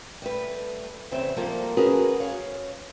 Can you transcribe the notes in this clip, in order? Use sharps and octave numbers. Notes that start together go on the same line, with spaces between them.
G3 A3 B4
E2 C#3 A3 C4 E5
F3 G3 A#3 A4 A#4
C#4 F#4 G#4 A#4 B4
C#5 F5